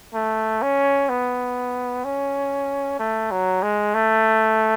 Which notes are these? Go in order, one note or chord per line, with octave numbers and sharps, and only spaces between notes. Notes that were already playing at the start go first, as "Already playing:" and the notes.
A3
C#4
B3
C#4
A3
F#3
G#3
A3